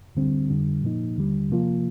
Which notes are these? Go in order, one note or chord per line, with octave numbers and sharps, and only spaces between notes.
D2 D3 G3 C4
F2 D3 G3
A#2 F3 A#3 D#4
D#2 D3 G3
C3 F3 A#3 F4